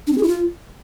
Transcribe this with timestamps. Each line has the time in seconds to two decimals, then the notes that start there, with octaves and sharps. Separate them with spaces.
0.07 D4
0.12 C4
0.18 G#4
0.23 E4
0.28 F4